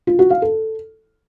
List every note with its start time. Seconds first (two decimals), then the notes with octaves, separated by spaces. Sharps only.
0.07 F4
0.19 F#4
0.31 F5
0.42 A4